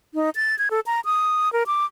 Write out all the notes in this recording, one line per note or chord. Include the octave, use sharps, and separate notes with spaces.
D#4
A6
G#6
A4
A#5
D#6
A#4
D6